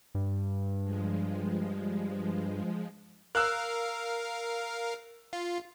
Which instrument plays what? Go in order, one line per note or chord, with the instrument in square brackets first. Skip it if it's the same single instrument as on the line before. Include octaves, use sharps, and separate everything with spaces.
[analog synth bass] G2
[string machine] F3 G#3
[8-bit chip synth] A#4 F5 [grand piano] E6 F#6
[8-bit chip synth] F4